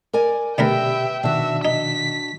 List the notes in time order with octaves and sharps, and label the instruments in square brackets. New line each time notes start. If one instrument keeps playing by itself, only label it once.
[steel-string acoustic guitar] A#4 D5 G#5
[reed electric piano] B2 G4 [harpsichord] D3 A3 A#4 [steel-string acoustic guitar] B4 [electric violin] E5 G5
[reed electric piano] B2 D#3 [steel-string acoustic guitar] D4 F#4 [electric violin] E5
[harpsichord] D#4 [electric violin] B6